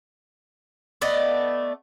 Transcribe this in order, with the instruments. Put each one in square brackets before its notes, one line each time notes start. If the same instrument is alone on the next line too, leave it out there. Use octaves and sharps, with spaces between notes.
[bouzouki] A3 B3 D5 D#5